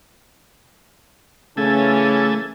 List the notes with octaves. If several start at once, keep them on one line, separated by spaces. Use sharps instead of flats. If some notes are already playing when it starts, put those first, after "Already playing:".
C#3 E3 A3 C#4 A4 G#5